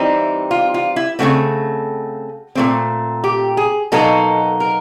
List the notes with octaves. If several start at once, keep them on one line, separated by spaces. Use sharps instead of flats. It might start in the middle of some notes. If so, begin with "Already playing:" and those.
Already playing: E3 G3 C4 D#4 E4
F4
F4
E4
C#3 F3 A3 C4 F#4
A#2 F3 A3 C4
G4
G#4
B2 F#3 A#3 D#4 A4
A#4